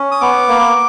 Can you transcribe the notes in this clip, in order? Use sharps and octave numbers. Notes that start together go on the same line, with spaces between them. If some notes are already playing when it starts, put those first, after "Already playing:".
Already playing: C#4
D#6
B3 D6
A#3